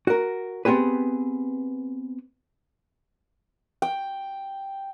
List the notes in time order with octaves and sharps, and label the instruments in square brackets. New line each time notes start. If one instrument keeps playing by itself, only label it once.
[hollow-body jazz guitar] F#4 A#4
B3 C4 G4 G#4 B4
[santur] G5